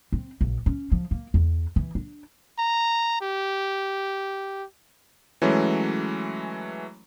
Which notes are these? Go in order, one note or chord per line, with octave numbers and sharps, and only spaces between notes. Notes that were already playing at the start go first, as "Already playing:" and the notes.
C4
A#1
C#4
F3
A#3
E2
E3
D4
A#5
G4
E3 F#3 G#3 A3 C#4